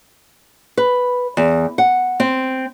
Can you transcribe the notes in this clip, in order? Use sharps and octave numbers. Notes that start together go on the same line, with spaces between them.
B4
E2
F#5
C4